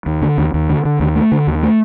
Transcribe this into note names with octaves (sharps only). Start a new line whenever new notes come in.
D#2
D3
D#2
D#2
D3
D3
D#2
A3
D3
D#2
A3